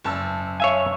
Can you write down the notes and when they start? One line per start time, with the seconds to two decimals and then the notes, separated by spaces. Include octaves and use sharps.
0.04 F#1 A5 E6
0.60 C#5 E5 F5 G#5